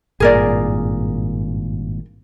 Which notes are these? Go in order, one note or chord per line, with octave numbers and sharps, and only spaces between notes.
G#1 G2 A#2 G#4 A#4 D5